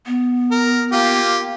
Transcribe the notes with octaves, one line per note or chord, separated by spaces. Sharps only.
B3
A#4
A#3 F4 G4